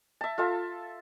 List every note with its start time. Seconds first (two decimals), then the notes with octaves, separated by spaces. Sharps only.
0.21 E5 A5
0.38 F4 A4 E5 A5